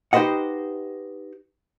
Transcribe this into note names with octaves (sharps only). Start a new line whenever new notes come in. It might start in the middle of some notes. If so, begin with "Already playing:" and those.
D#4 G4 B4 C5 D#5 F#5